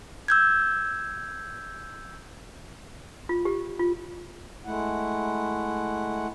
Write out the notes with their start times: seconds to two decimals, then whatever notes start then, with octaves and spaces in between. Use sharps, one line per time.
0.28 E6 G6 G#6
3.29 F4
3.45 G4
3.79 F4
4.65 G#3 A3 E4 F#5